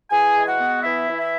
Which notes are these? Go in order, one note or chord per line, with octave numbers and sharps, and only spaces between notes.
E3 G#4 G#5
G#3
F#4 F#5
B3
E3 E4 E5
E3
E4 E5